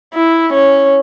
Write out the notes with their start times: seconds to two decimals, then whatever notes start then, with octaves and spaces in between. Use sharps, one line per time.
0.14 E4
0.54 C#4